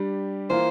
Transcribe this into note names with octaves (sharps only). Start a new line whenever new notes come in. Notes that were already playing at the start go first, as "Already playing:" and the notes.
Already playing: G3 D4 G4
E3 A#3 F4 C5